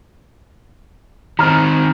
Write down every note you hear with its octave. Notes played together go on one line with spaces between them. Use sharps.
D#3 C4 A#5 F6